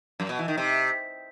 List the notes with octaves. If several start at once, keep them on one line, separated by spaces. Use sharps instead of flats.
F#2
B2
E3
D#3
C3